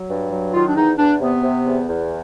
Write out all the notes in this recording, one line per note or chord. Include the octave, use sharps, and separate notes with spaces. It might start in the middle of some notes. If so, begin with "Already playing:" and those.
Already playing: F#3
G2
F#3
D#3 F4
D4
E2 D#4
E2 D4
C3 B3
C3
E2
E2